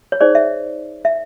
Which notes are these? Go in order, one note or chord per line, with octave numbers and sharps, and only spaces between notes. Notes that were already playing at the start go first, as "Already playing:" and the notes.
C#5
D#4 G#4 C5 D5
E5
E5